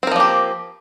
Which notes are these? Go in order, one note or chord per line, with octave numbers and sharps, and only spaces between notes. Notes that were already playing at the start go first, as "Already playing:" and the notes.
F3 A#3 C4 G4 A#4